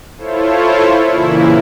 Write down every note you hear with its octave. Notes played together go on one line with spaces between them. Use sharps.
E4 F4 A4 C5 C#5
A#2 C#3 E3 A#3 E4